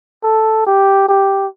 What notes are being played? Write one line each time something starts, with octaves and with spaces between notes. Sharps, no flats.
A4
G4
G4